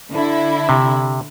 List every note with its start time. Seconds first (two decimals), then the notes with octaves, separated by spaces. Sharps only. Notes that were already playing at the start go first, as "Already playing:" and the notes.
0.13 D3 E4
0.69 C3